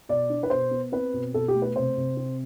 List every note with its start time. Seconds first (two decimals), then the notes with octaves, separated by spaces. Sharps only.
0.09 B2 D5
0.29 D4
0.43 B4
0.50 B2 C5
0.71 B3
0.92 C4 B4
1.13 B2
1.34 B2 A4
1.48 G4
1.54 A3
1.62 B4
1.76 C3 C5
1.97 C3
2.17 C4